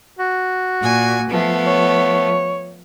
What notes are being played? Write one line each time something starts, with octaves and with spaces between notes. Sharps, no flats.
F#4
A#2 G#5
F3 A3 B3
C#5